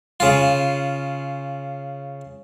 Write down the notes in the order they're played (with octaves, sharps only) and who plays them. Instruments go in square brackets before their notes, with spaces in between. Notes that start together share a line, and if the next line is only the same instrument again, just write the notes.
[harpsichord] C#3 F4